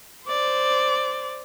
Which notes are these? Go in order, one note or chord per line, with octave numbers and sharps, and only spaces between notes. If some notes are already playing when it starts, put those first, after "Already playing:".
C5 D5